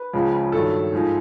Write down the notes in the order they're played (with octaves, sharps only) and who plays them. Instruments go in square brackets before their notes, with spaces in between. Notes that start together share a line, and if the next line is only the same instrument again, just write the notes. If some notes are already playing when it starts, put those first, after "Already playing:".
Already playing: [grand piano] B4
C#2 C#3 F3 G#3
G2 D#3 F#3 A4
G#2 F3 G#3